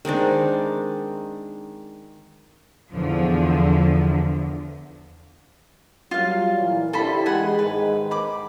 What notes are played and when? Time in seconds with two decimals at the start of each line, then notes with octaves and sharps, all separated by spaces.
0.05 D#3 G#3 C4 D4
2.91 E2 D3 F3
6.11 F#3 G3 F4 F5
6.58 A#2 E3
6.93 D3 E4 G4 A4 C5 B5
7.26 E3 G#3 G#4 F#5 G#5
7.59 G#2 D#3 B4
8.11 B5 D6